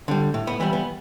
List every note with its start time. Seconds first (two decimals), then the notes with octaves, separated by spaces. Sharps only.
0.08 D3 G3
0.34 A2
0.47 B3
0.60 E3 G3 B3
0.73 B3